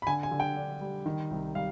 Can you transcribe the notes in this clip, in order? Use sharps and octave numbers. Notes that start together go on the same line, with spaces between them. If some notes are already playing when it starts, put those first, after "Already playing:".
B5
D3 G#5
G#5
D3
G5
D4
G3
D#3
C2
G3 F5